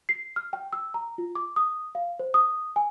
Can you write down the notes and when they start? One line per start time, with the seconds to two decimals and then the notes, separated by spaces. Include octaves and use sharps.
0.09 C7
0.36 F6
0.53 G5
0.73 E6
0.94 A#5
1.18 F4
1.35 D6
1.56 D#6
1.95 F5
2.19 C5
2.34 D#6
2.76 G#5